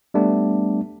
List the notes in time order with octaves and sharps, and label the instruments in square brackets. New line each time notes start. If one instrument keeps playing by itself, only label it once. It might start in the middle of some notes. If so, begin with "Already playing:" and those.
[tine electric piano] G3 A3 B3 D4